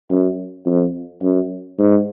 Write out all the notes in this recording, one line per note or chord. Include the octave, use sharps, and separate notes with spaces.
F#2
F2
F#2
G#2